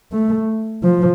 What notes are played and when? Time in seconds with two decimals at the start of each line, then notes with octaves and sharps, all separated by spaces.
0.12 A3
0.83 F3